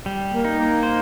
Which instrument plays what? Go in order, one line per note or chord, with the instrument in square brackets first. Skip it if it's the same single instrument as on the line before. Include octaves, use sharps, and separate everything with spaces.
[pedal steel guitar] G3
[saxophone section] A#3
[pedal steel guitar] D#4
[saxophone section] A#3
[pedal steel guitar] C5